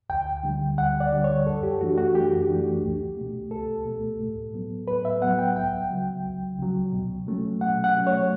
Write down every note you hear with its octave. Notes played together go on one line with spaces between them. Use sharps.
D2 G5
D3 G3
D2 F#5
D5
D3 G3
C#5
F#2 A4
G4
E3 A3 D4 F#4
F#4
F#2 G4
E3 A3 D4
C#2
B2 A3
C#2 A4
B2 A3
A2
F#3 B3
A2 B4
E5
F#3 B3 F#5
G5
C#2 G5
C#3 F#3
C#2
C#3 F#3
B2
F#3 A3 C#4
B2 F#5
F#5
F#3 A3 C#4
C#5